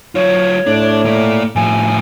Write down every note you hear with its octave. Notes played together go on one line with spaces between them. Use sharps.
F#3 F4 C#5
A2 D4
A#3 D5
A2 F3 G#5